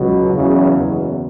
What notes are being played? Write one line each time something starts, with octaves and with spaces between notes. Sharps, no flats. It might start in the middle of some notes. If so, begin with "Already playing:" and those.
Already playing: C#2 B2 F#3
E2 C#3 F#3
F#1 E2 B2 F#3